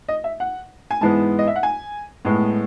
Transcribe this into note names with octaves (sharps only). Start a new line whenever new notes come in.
D#5
E5
F#5
G#5
G#2 E3 G#3 B3 A5
D#5
E5
F#5
G#5
A2 G#3 B3